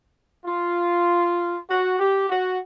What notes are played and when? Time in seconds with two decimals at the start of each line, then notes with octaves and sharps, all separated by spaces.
0.46 F4
1.69 F#4
1.99 G4
2.30 F#4